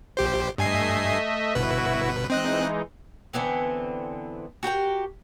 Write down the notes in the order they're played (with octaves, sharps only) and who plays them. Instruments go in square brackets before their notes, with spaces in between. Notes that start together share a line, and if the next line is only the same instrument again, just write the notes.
[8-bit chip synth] A#1 G4 C5
[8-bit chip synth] G2 G#5 C7 [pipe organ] A3 D#5 E5
[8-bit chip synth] G1 B2 B4 [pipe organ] E4 F#4
[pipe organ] E3 G#3 D#4 [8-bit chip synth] C4 D#5 F#6
[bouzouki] D3 E3 B3 C4
F#4 G4 A#4 G5